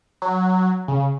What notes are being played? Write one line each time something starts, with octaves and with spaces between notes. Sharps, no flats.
F#3
C#3